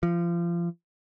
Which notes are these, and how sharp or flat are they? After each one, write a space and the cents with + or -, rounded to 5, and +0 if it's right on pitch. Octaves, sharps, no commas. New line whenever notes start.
F3 -30